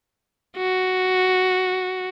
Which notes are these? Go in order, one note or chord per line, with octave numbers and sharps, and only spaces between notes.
F#4